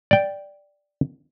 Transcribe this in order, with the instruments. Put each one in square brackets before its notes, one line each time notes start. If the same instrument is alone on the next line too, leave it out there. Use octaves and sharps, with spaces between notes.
[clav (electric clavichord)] D5 G5